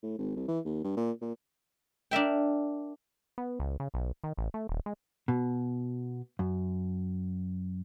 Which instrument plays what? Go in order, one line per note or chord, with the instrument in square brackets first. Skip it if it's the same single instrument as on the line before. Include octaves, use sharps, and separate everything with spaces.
[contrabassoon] A2
G#1
C2
E3
D#2
G2
A#2
A#2
[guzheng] D4 A#4 E5 G5
[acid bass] B3
C#2
C#3
B1
D#3
A1
A3
D#1
G#3
[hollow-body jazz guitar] B2
F#2